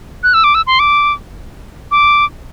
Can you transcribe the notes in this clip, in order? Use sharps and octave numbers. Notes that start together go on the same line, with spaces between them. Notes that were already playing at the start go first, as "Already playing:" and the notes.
F#6
E6
D6
E6
C6
D6
D6